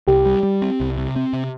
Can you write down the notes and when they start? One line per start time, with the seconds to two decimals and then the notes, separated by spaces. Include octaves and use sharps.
0.07 C2 G4
0.25 G3
0.43 G3
0.62 C4
0.80 C2
0.97 C3
1.16 C4
1.33 C3